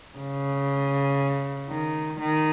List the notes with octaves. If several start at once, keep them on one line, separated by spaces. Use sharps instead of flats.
C#3
D#3
D#3